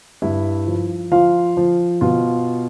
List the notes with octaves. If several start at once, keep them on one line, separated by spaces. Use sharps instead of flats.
G2 E4 E5
F3
F3 F4 F5
F3
B2 F4 F5